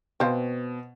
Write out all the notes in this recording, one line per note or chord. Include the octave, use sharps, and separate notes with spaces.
B2 C4 C5 F5